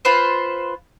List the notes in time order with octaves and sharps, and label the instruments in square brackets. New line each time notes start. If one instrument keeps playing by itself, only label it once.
[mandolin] F4 B4 C5